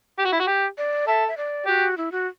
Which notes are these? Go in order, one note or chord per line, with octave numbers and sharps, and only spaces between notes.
G4
F#4
E4
F#4
G4
D5
A4 E5
E5
D5
F#4 G4
E4
F#4